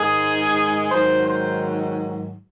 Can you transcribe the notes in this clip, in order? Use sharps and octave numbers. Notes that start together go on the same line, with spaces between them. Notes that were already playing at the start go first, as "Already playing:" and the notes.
Already playing: G#2 D#3 G#3 G#4
G#2 D#3 F#3 C5
C5